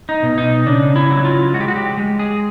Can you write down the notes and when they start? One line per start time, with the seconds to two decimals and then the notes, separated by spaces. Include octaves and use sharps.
0.09 D#4
0.23 B2
0.38 D#4
0.67 C#3 D4
0.96 E4
1.10 F#3
1.25 F4
1.53 G#3 F#4
1.61 G4
1.68 F#4
1.76 G4
1.97 G#3
2.19 G#4